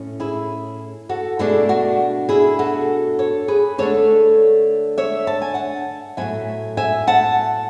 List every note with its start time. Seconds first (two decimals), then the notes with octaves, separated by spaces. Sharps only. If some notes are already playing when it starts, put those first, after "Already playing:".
Already playing: A2 C#4
0.20 E4 G#4
1.09 F#4 A4
1.39 B2 A3 D4 E4 G#4
1.69 F#4
2.29 E4 G#4
2.59 F#4 A4
3.19 A4 C#5
3.48 G#4 B4
3.78 D3 A3 D4 A4 C#5
4.98 C#5 E5
5.27 A5
5.42 G#5
5.54 F#5 A5
6.17 A2 F#3 B3 E5 G#5
6.77 E5 G#5
7.07 F#5 A5